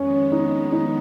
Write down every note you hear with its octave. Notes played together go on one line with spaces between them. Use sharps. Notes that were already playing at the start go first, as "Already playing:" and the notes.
Already playing: F2 D#3 G#3 B3 C#4
D#4
D#4